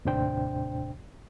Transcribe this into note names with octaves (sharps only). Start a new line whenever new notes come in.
D#2 A2 C3 D4 C5 G5